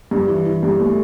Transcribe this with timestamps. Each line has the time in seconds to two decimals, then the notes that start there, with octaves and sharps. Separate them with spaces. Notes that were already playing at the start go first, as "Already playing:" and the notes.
0.11 G2
0.28 E3
0.45 E3
0.63 G2
0.80 A3